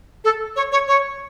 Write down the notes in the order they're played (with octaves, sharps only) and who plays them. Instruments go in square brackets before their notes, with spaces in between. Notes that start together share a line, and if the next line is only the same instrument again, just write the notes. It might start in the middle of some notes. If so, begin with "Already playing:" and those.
[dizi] A4
C#5
C#5
C#5